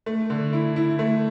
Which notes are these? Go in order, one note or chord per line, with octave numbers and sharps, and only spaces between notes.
A3
D3
E4
E4
A3